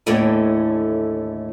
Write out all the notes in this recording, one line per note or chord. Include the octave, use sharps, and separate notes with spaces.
D#2 A2 D3 E3 A3 C#4